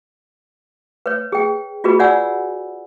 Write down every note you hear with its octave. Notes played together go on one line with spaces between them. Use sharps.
B4 C#5
G#4 G5
F4 F#4 G#4 B4 B5
C#5 D5 F#5 G#5 E6